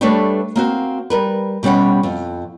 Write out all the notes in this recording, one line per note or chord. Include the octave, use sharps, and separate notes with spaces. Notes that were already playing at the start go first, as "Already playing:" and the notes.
G3 A3 D4 A4 B4 C#5
A#3 C4 F#4
G3 A#4 B4
B2 G3 C#4 G4 F#5
F2